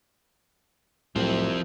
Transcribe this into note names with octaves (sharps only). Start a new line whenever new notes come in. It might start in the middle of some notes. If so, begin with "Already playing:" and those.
C2 A2 F3 F#3 C4